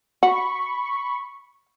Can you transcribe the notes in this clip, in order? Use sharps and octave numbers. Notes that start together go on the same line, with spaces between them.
F#4 B5 C#6